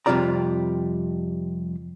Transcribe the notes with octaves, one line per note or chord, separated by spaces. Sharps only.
F2 C3 G3 F4 D5 A#5